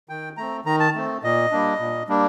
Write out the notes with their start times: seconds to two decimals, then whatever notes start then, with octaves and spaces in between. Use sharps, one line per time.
0.09 D#3 G5
0.37 A3 C4 A#5
0.65 D#3 A#5
0.80 A5
0.95 A3 C4
1.23 A#2 D#5
1.51 G3 A#3 D4
1.79 A#2
2.08 G3 A#3 D4